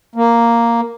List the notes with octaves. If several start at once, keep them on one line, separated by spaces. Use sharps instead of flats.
A#3